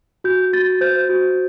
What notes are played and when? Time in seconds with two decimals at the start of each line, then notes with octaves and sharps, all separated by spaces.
0.24 F#4 G6
0.53 F#4 A6
0.81 C5 G6
1.09 F#4